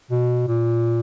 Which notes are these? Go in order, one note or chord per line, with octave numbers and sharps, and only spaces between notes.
B2
A#2